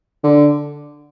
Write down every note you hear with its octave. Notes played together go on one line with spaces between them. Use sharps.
D3